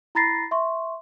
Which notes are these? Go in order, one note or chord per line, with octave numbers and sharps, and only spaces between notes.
E4 A#5 B5 A6 A#6 C7
E5 C6 C#6